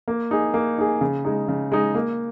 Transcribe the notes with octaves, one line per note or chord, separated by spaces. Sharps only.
A#3
D#4 G#4
A#3
D#4 G#4
C#3
G#3 D#4
C#3
G#3 D#4
A#3